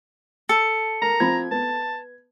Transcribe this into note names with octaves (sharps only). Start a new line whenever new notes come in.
A4 C#7
A#4 A#5
F3 C4 B5 G#6
B3 A5